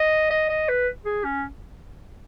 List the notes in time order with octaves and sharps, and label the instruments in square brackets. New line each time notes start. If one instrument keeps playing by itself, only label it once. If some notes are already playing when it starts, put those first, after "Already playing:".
Already playing: [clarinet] D#5
D#5
D#5
B4
G#4
C#4